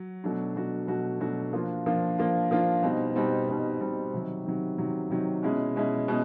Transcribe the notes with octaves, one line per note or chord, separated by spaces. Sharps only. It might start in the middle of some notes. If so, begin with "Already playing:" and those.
Already playing: F#3
B2 F#3 A3 D4 F#4
B2 F#3 A3 D4 F#4
B2 F#3 A3 D4 F#4
B2 F#3 A3 D4 F#4
F3 A#3 D4 F4
F3 A#3 D4 F4
F3 A#3 D4 F4
F3 A#3 D4 F4
B2 G3 C4 D#4
B2 G3 C4 D#4
B2 G3 C4 D#4
B2 G3 C4 D#4
C3 D#3 F#3
C3 D#3 F#3
C3 D#3 F#3
C3 D#3 F#3
B2 G#3 C#4 E4
B2 G#3 C#4 E4
B2 G#3 C#4